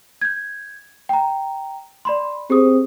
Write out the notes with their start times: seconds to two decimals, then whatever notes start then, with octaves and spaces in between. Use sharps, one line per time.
0.22 G6 G#6
1.09 G5 A#5
2.05 D5 B5 C6
2.50 C4 G4 G#4 D#6